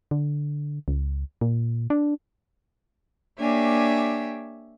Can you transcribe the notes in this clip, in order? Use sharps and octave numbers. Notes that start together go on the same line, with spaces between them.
D3
C#2
A#2
D4
A#3 D4 G4 C#5 E5 G#5